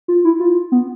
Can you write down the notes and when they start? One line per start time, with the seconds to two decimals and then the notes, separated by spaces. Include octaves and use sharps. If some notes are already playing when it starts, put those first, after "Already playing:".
0.08 F4
0.24 E4
0.40 F4
0.72 B3